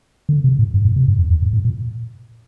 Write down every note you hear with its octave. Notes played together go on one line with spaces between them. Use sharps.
D3
C3
A2
G2
A2
C3
G2
F2
F2
G2
A2
A#2